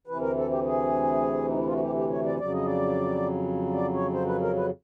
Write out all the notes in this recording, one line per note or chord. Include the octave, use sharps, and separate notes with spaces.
D2 C3 E3 B4
A#4
A4
G4
G#4
D#4
E4
F4
F#4
G4
G4
C#5
D5
F2 C#3 F#3 D5
D#5
D5
D5
C#5
C5
B4
A#4
B4